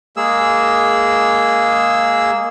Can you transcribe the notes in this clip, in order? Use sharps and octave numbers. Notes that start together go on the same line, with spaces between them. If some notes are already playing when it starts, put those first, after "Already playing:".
G#3 A#3 G#4 E6